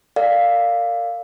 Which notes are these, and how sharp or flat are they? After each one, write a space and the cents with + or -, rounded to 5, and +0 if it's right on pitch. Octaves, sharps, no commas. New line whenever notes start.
A#4 -30 D5 +10 F5 +0